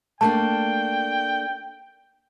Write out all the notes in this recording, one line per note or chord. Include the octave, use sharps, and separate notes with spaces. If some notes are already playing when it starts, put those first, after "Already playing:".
A3 A#3 D4 G5 A5